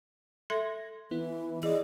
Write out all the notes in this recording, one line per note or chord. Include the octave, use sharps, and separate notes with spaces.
A4 E5 C6 G#6 A#6
E3 B3 E4
E3 G#4 D5 D#5